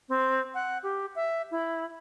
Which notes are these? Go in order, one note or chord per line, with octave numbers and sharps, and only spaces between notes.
C4
F#5
G4
E5
E4